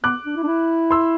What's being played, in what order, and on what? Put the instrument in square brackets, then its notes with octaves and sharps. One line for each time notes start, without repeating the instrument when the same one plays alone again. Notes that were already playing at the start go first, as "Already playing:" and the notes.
[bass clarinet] B3 [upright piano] D6 F#6
[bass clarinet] D4
E4
D4
E4
[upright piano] C6 E6